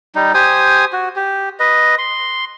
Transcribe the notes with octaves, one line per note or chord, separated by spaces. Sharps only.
G3 D#4
G4 C5 G#5 D#6
F#4
G4
B4 D#5
C6